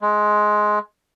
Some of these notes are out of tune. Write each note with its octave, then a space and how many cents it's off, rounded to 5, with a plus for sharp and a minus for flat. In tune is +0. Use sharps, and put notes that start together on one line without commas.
G#3 +15